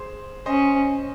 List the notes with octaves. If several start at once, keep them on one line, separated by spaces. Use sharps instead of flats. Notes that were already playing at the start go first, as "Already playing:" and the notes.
Already playing: G#4 C5
C#4 C5 D#5